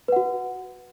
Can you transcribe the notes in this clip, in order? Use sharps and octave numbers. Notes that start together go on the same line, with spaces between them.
F#4 B4 F#5